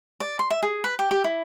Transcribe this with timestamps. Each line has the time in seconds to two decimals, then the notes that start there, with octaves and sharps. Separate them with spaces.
0.20 D5
0.39 C6
0.50 E5
0.63 G#4
0.84 B4
0.99 G4
1.11 G4
1.24 E4